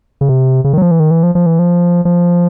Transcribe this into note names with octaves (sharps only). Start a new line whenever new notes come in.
C#3
C3
C#3
D#3
F#3
F3
E3
D#3
E3
F3
F3
E3
F3
F3